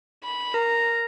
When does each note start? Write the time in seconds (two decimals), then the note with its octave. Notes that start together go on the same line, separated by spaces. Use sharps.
0.24 B5
0.54 A#4 A#5